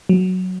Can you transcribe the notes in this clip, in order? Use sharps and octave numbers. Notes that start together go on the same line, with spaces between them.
F#3